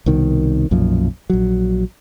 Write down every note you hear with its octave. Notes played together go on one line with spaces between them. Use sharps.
C2 B2 D#3
B1 F#2 A#2 F3
A#1 F#3